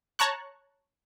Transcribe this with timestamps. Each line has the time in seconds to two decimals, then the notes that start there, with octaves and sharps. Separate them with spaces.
0.19 C#5 A5 A#5 C#6 F#6